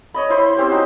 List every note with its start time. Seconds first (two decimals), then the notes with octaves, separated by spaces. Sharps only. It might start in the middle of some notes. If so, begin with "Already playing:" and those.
0.14 C#5 D#5 B5
0.30 E4 C5 B5
0.43 C5
0.57 C4 C#4 G4 C5
0.71 D#4 F#4